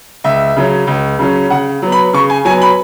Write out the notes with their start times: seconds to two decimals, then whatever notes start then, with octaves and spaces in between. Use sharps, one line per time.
0.24 C#2 E5
0.56 C#3 F#3 C#4
0.87 C#2
1.19 C#3 F#3 C#4
1.50 C#3 F#5
1.82 F#3 B3
1.92 B5
2.13 C#3 C#6
2.30 G#5
2.45 F#3 G#5
2.49 B3
2.61 B5